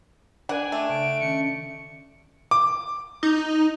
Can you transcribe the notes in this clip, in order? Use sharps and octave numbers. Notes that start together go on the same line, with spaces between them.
D4 F#5 G#5
A3 G5
C#3 D7
D#3 C#4 C#7
D6
D#4